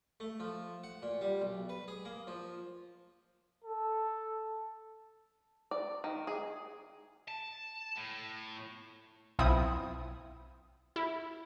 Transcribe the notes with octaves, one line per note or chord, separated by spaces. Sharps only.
A3
F3
F#5
A#2
G3
B1
B4
G#4
A#3
F3
A4
D5
D#3
G#4
A5
A2
B1 C4 E4 F4 D#6
E4